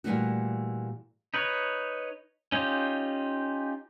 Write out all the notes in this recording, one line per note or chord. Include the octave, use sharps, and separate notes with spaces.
A#2 C#3 E3 G3 A3 F#4
D#4 B4 C#5
C#4 D#4 F4 G4